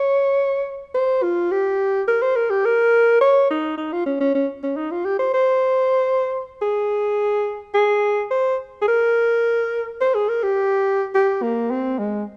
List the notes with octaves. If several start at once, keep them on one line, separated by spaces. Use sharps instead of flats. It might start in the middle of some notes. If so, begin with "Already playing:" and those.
Already playing: C#5
C5
F4
G4
A#4
C5
A#4
G4
A#4
C#5
D#4
D#4
F4
C#4
C#4
C#4
C#4
D#4
F4
G4
C5
C5
G#4
G#4
C5
G#4
A#4
C5
G#4
A#4
G4
G4
A#3
C4
G#3